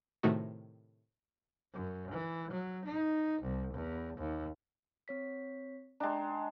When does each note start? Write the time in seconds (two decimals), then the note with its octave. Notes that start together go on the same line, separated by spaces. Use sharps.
0.23 A2 C3 D#3 A3 D#4 F#4
1.74 F#2
2.11 E3
2.51 F#3
2.85 D#4
3.42 C2
3.74 E2
4.18 D#2
5.08 C4 C#5 B6
6.00 G#3 D4 G5 A#5